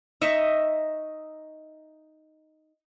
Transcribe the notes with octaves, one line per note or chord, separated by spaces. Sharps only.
D#4 D#5 E5 C#6